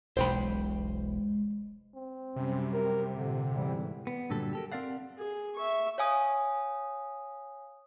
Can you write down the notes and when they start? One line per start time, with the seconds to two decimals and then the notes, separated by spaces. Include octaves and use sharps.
0.17 E1 B1 G#3 C5 G5 B5
1.95 C4
2.36 F#2 C3 F#3 G3 C#4
2.73 G4 A#4
3.13 F2 A#2 D3
3.56 E2 G#2 E3 G3
4.07 B3
4.30 G2 A#2 D3 F#3 G3 A4
4.53 G4 A4 A#4
4.72 C4 A#4 D5 F5 F#5
5.18 G#4
5.56 E5 C#6
5.98 C#5 F5 G#5 D#6